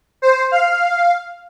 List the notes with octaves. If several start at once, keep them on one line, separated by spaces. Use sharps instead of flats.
C5
F5